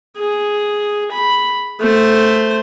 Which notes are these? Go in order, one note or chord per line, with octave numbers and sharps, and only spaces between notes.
G#4
B5
A3 C5